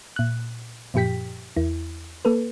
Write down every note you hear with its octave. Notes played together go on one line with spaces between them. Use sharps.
A#2 F#6
F#2 A#2 F3 G4 G5 B6
E2 E4
A#3 A4 B4